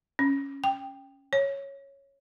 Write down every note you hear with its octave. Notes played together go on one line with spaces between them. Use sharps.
C#4
G5
C#5